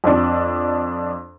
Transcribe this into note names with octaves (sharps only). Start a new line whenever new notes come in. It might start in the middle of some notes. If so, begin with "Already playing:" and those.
F2 D4